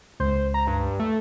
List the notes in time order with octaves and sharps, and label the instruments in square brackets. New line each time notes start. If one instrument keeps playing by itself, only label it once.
[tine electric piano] C#2 [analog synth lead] C5
[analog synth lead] A#5
G2
A3